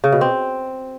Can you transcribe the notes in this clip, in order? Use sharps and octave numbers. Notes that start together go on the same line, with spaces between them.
C#3
B2
C4